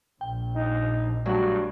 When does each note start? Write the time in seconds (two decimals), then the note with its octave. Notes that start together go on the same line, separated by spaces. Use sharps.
0.21 A#1 A#2 G5
0.55 D#4
1.26 G2 F#3 G3 A3 F#5